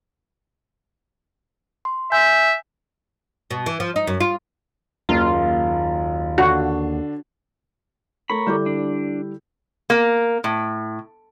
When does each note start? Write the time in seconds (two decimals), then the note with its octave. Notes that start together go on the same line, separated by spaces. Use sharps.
1.85 C6
2.12 E5 G#5 G6
3.51 B2
3.66 E3
3.80 F3
3.96 D#4
4.07 F#2
4.20 F4
5.09 F#1 D#2 F4
6.38 D3 D4 F#4
8.30 A3 A#4 C#5 B5
8.47 D3 G3 E4 A4 D6 G6
8.66 D4
9.90 A#3
10.44 A2